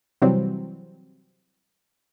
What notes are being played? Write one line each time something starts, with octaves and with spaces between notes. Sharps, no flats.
C3 E3 F#3 G3 C4